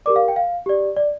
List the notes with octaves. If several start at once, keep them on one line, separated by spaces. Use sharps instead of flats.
G4 A#4 D5 D6
F5
G5
F5
G4 D5
D5